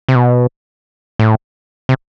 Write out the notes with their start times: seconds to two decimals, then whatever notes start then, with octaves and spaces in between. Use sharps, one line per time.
0.09 C3
0.15 B2
1.19 A2
1.89 C3